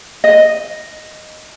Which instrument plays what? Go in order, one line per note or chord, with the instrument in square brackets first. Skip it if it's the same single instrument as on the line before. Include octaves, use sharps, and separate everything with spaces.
[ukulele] D#5